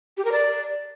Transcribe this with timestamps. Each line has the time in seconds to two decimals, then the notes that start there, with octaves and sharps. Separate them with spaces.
0.17 G4
0.25 A#4
0.32 D5